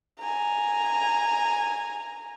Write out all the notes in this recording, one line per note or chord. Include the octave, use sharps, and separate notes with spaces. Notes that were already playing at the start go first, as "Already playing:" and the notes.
G#5 A#5